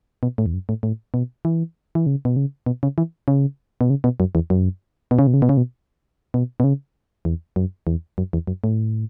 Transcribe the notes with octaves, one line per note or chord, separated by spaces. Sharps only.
B2
A2
E2
F#2
A2
A2
B2
E3
E3
C#3
B2
C#3
B2
C#3
E3
C#3
B2
C#3
B2
F#2
E2
F#2
B2
C#3
B2
C#3
B2
C#3
B2
B2
B2
C#3
E2
F#2
E2
F#2
E2
F#2
A2